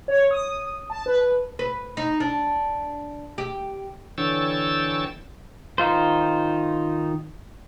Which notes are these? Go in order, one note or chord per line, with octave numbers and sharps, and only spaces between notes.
C#5
D#6
A5
B4
B4
D#4
D4
G4
D3 E3 C#5 G5 E6 A6
D#3 D#4 F4 C5